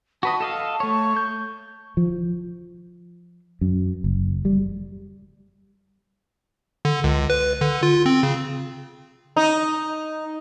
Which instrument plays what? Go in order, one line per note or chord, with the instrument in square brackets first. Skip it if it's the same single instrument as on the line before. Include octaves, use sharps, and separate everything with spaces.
[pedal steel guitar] F#4 B4 D#5 [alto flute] A5
[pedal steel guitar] A4 D#5 F5
[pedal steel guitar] A3 C#5 [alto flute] C#6
[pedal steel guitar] G6
[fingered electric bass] F3
F#2
F#1
G3
[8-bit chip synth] D3
C#2
B4
D3
F4
C4
C#3
[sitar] D#4